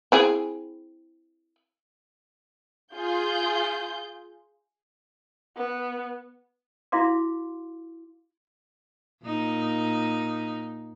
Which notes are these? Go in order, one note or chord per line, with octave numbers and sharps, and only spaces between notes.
C4 E4 G#4
F4 G#4 G6
B3
E4 F#4 F5 C6 D6
A#2 D#4